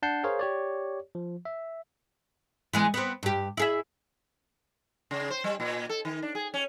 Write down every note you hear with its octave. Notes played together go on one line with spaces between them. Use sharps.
D4 F#5 A5 G6 C7
G#4 A#4 C5 C#5 F5
G4 C#5 D5
F3
E5
E3 G#3 B3
B3 C4
G2 G4
E4 G#4 E5
C#3
C5
G3
A#2
A4
D#3
D4
G#4
C#4